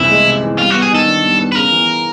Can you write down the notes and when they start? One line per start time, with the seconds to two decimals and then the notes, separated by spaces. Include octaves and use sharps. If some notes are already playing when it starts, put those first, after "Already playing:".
Already playing: C2 C3 E3 E4
0.10 G#3
0.26 C3
0.42 E3
0.58 G3 F4
0.70 F#4
0.74 B3
0.82 G#4
0.91 D#3 A4
1.07 D4
1.24 G3
1.39 B3
1.52 B4
1.55 C#3 A#4
1.72 E3